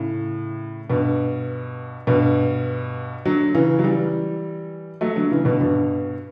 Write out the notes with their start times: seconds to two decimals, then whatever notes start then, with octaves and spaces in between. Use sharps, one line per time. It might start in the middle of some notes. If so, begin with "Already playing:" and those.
Already playing: A2 C#3
0.90 G2 B2
2.07 G2 B2
3.25 D3 F#3
3.54 C#3 E3
3.79 F#3
3.84 E3 G3
5.01 F#3 A3
5.16 D3 F#3
5.31 C#3 E3
5.45 B2 D3
5.61 G2 B2